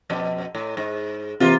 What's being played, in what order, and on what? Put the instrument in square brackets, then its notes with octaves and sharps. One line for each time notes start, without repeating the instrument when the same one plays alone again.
[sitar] F2 B2
A2
G#2
[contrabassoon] C3 [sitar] E3 A#3 F4